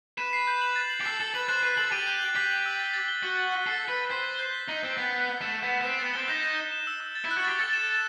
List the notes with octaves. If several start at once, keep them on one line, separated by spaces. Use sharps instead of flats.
B4 E7
C7
G6
F#7
A6
F#7
G4
A4 C7
A4 A6
B4 F#7
C5 F#6
B4 F#6
A4 F#7
G4 D#7
G6
F#7
G4 B6
F#7
E6
A6
A6
G7
F#4 A6
A6
F#6
A4 C7
A6
B4
A6
C5 B6
G7
G6
B6
D#4 F#7
C4 F#7
B3 B6
F#6
B6
A3 E7
E7
B3
E7
B3
C4 E7
B3 A6
C4 G7
D#4 G6
G6
G6
E7
E6
E6
A6
E4
F#6
F#4
G4 A6
A4 A6
E7
E7